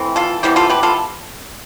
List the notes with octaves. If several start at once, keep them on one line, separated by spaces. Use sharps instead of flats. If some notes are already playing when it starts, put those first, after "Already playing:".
Already playing: E3 A3 C4
F4 A4
C3 E3 G3 B3 E4 G4
F4 A4
G4 B4
F4 A4